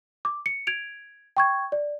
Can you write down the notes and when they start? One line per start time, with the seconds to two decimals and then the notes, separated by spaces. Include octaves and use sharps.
0.25 D6
0.46 C#7
0.67 G#6 D7 F7
1.37 G5 C#6 G#6
1.72 D5